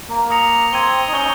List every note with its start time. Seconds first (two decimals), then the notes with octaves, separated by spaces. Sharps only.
0.10 A#3
0.30 D#6 A#6 C#7 F7
0.73 C4 G#6 D#7 G7
1.08 D#4
1.13 C#4 G6 C#7 G7